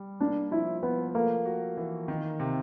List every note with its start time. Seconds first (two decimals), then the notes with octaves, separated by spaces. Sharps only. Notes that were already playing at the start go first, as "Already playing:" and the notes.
Already playing: G3
0.20 A#3 D4
0.51 F3 E4
0.83 F3 B3
1.15 A3 A#3
1.45 F#4
1.77 E3
2.08 D#3
2.40 C3